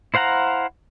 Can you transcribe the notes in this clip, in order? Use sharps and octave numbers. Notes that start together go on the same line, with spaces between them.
E4 C5 F5 F#5 A#5